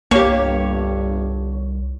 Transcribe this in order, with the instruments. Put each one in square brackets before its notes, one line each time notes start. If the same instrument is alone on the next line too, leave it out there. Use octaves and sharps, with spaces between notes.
[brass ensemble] G1 G2 [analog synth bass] C2 [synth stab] A#3 G4 [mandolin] C#5